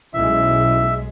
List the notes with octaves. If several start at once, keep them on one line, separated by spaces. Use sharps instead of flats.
B1 G#3 C#4 E4 E5